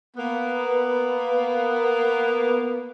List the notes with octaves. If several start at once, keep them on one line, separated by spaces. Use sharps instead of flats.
A#3 B3